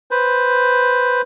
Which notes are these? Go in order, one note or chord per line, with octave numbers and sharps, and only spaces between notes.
B4 C5